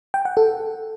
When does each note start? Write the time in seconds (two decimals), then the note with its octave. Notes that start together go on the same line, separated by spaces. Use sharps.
0.14 G5
0.25 F#5
0.37 A4